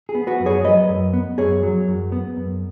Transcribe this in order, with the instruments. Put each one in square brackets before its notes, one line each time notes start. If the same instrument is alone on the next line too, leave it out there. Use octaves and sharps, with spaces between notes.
[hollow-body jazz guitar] G#4
B3
F#4 B4
F#2
G#4 C#5
F#3 B4 D#5
F#2
B3
F#2 G#4 C#5
F#3
F#2
B3
F#2